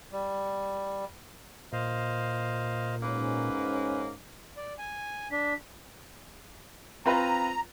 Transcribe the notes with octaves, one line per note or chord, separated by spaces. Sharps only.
G3
A#2 C5 D#5 F5
G#2 A#3 C#4 B4
D5
G#5
D4 B6
C4 F4 B4 A#5